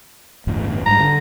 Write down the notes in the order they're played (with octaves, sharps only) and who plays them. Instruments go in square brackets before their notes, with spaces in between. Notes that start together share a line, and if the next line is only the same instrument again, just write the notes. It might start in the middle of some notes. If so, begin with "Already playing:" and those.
[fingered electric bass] G1 E2 A2
[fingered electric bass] G#2 G3 [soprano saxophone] A#5
[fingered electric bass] D3